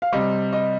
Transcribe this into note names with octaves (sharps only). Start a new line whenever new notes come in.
F5
C3 G3 D#5
D#5